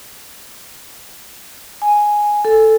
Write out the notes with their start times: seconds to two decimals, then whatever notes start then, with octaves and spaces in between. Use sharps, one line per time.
1.82 G#5
2.45 A4